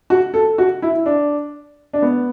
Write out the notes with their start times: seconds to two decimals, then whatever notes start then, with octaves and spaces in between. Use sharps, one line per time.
0.10 F#4
0.34 A4
0.58 F#4
0.82 E4
1.06 D4
1.93 D4
2.02 B3